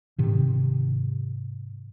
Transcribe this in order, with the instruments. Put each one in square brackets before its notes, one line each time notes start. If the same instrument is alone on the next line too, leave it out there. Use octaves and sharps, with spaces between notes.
[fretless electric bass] G#2 C3 D#3